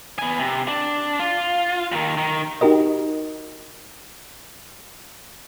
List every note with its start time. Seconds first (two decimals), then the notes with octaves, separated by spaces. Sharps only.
0.19 B3 G#5
0.40 C3
0.68 D4
1.19 F4
1.92 D#2 D#3
2.17 D#3
2.61 D#4 F#4 G4 A#4 D#5